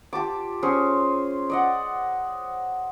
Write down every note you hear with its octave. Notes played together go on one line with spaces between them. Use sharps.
F4 G4 A5 D6
C#4 G#4 C5
D5 D#5 F#5